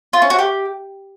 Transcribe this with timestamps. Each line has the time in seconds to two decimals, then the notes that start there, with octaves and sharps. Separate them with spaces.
0.13 F4
0.22 C#4
0.30 F#4
0.39 G4